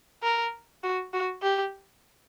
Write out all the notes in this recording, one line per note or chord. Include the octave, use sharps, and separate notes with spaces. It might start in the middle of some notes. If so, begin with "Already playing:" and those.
A#4
F#4
F#4
G4